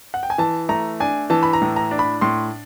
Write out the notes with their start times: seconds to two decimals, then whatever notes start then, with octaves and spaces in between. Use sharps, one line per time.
0.14 F#5
0.23 G5
0.30 G#5
0.38 E3 A5
0.69 A3 A#5
1.00 D4 G#5
1.30 E3 A5
1.43 B5
1.53 A#5
1.62 A2
1.76 A#5
1.91 D4
1.99 B5
2.21 A2 C6